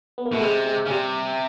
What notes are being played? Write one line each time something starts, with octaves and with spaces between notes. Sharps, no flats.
B3
A#3
B2 A3
C3 G#3
G#3
C#3
C3 G3